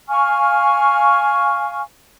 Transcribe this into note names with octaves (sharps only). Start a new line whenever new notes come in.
F5 G#5 C#6 F6